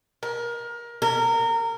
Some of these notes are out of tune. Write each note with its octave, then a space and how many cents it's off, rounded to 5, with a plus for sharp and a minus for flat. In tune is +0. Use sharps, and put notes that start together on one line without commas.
A#4 +25
A#4 -25